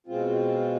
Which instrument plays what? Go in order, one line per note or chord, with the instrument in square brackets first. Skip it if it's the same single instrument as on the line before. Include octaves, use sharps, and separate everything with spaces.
[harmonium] B2 G#3 C4 F4